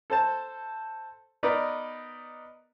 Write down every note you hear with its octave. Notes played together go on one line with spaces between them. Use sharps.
A4 C5 A5
B3 D#4 A#4 B4 D5